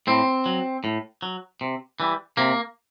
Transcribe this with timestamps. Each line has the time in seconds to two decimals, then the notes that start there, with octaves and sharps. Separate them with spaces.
0.07 A2 C4
0.46 F#3
0.84 A2
1.22 F#3
1.61 C3
2.00 E3 G3
2.37 C3 A#3